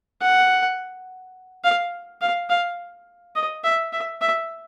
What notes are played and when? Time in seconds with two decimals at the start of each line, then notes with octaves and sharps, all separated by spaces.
0.21 F#5
1.64 F5
2.21 F5
2.49 F5
3.36 D#5
3.64 E5
3.93 E5
4.21 E5